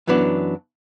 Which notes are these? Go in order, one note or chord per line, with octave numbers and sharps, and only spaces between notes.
F#2 E3 F#3 B3 D4